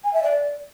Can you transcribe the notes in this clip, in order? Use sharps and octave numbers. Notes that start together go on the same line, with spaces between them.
G#5
E5
D5